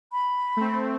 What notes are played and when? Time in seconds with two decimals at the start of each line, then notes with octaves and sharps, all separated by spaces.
0.12 B5
0.57 A3 C4